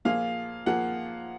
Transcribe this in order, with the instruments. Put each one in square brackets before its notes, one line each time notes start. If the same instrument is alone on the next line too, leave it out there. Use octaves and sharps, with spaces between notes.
[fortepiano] A#2 F3 A#3 F4 G#4 [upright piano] F5
[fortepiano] A#2 F3 A#3 F4 G#4 [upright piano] F#5